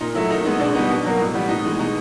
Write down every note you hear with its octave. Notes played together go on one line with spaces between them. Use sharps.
A#2 D#4
F#3 A3 E4
D#3 D#4
G#3 B3 D#4
B2 D4
G3 B3 D#4
B2
F#3 A#3
A2
E3 G3 B3
A2 D#4
E3 G#3
B2 D#4